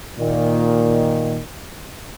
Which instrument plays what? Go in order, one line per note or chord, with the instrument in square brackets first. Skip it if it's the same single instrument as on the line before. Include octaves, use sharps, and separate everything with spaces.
[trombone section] A#2 D#3